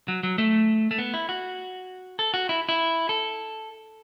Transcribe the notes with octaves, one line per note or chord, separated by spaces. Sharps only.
F#3
F#3
A3
A3
B3
E4
F#4
A4
F#4
E4
E4
A4